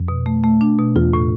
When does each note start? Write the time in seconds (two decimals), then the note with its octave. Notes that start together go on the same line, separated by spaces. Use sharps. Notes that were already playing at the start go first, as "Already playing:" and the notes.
Already playing: F2
0.08 B2
0.26 A3
0.44 A3
0.61 D4
0.79 B2
0.96 E2 F4
1.13 A2